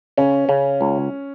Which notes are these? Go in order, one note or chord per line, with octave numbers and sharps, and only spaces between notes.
C#3 C#4
C#3
C#2